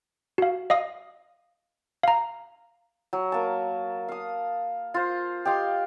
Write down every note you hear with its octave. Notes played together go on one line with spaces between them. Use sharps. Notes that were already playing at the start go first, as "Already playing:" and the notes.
F#4 F5
D#5 F5 D#6
F5 A#5
F#3
A#3 A5
F5 D#6
F4 C5
G4 D#5 F5 C6